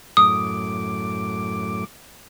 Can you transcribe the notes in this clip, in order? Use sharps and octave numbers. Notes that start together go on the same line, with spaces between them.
F#2 A2 D6 D#6